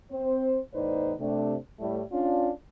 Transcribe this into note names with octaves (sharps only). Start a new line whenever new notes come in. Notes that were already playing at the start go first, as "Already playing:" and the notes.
C4 C5
E2 A2 D#4 B4 C5 D5
C3 A3 D4
A2 G3 A3
C#4 D4 F4